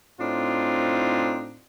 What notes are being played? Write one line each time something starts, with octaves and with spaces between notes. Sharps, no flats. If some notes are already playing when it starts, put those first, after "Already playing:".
A2 C4 D4 D#4 F4